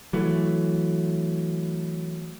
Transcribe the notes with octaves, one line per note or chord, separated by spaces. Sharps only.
E3 F#3 A3